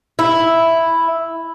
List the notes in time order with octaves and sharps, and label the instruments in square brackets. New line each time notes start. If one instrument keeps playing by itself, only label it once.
[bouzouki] E4